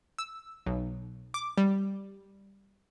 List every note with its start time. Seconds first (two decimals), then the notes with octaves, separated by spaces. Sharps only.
0.18 E6
0.66 B1
1.34 D6
1.58 G3